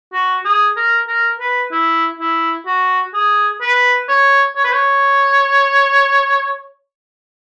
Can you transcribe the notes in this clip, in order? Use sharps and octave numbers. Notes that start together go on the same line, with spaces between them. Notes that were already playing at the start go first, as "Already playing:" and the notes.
F#4
G#4
A#4
A#4
B4
E4
E4
F#4
G#4
B4
C#5
C#5
B4
C#5